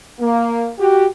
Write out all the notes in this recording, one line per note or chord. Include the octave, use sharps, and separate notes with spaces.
A#3
F#4 G4